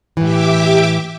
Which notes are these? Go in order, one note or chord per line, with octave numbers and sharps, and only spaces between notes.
A2 E3 G4 E5 D6